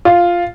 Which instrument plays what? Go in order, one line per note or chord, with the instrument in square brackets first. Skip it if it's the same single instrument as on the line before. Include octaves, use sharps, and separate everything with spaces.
[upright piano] F4